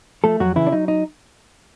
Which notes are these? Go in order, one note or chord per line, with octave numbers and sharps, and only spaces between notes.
F3 A3 A4
F2 F#3 F#4
C#3 E3 E4
D4
F#3 D#4
D#4